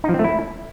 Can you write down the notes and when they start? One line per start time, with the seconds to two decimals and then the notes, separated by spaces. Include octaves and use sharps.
0.04 D#4
0.09 F3
0.14 C4
0.19 A3
0.24 E4